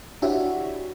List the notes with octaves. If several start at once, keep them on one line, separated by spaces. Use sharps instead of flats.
D4 E4 F#4 G4 C#5 E5